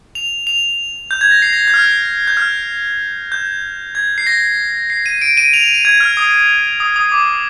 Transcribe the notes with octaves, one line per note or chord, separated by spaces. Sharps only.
F7
F7
G6
G#6
A#6
C7
A#6
G6
F6
G6
F6
G6
G#6
C7
A#6
C7
D#7
D7
D#7
F7
D#7
D#7
G#6
F6
D#6
D#6
D#6
D6